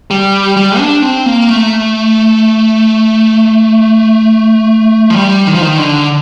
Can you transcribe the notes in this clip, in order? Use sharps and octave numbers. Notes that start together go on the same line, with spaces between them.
G3
G3
D4
C4
A#3
A3
F3
G3
D#3
F3
D#3
D3